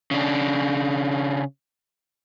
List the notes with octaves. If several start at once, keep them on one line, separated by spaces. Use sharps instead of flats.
C#3 D4